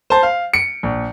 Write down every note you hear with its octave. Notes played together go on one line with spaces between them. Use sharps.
C5 A5
F5
C#7 D7
A#1